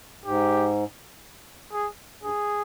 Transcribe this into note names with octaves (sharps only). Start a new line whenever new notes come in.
G#2 G4
G#4
G2 G#4